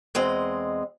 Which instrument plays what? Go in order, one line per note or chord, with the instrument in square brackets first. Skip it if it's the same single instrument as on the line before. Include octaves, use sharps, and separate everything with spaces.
[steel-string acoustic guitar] E2 G#3 C4 D#5